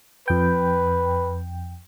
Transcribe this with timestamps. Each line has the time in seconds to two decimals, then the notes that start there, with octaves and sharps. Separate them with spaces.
0.28 F2 B4 G5